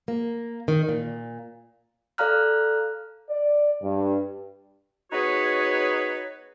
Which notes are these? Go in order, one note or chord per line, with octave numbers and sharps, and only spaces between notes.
A#3
D#3
A#2
A4 D5 F5 A#5 F6 F#6
D5
G2
B3 D#4 F#4 G#4 B4 C#5